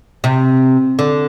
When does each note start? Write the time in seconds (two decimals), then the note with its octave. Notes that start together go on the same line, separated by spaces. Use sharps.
0.24 C3
0.99 D3